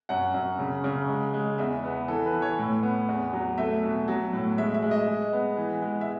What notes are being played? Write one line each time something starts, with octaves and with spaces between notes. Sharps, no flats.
F#2 F#5
F#2
C#3
C#3
G#3
G#3
E2 E5
B3
E3 A4
B4
E3
C#5
A2
B3
E2
F#3
A3 E5
B2
F#3
A2
G#3 E5
E5
G#3
D#5
G#3
B3
E3
G#3
E5